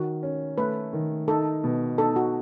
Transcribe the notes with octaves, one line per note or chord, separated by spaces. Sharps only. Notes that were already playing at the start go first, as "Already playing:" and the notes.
Already playing: D#3 F#4
C#4
A3 B4
D#3
D#4 A4
B2
D#4 A4
F#4